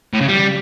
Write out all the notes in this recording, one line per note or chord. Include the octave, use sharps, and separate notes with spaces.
A2
C#3
G3